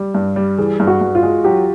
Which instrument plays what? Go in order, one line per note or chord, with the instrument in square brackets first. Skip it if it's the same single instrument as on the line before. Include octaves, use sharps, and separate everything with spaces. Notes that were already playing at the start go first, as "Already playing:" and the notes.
Already playing: [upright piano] G3
G2
G3
[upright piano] E3 [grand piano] G#4
[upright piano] G2
[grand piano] F#4
[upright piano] G2
[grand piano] F4
[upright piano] G#3
[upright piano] F#3 [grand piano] G4